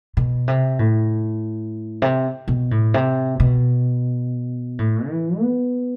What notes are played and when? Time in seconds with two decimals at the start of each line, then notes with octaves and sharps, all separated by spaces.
0.17 B2
0.48 C3
0.79 A2
2.02 C3
2.48 B2
2.71 A2
2.94 C3
3.40 B2
4.79 A2
5.09 E3
5.40 B3